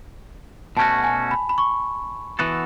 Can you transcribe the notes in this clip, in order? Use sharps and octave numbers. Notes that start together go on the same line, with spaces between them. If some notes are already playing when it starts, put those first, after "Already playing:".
B2 A3 C#4 F#4 A5
G#5
B5
B5
C#6
E3 B3 F#4 A4